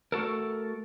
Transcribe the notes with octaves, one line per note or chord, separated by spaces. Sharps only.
A3 F#4 A4 A#4